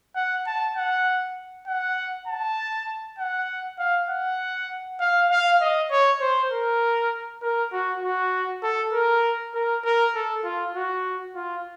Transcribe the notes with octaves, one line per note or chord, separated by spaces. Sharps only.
F#5
A5
F#5
F#5
A5
F#5
F5
F#5
F5
F5
D#5
C#5
C5
A#4
A#4
F#4
F#4
A4
A#4
A#4
A#4
A4
F4
F#4
F4